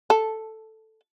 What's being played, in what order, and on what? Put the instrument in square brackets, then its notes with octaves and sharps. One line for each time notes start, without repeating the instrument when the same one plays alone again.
[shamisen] A4